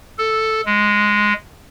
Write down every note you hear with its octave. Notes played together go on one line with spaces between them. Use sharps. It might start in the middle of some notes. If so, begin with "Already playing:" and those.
A4
G#3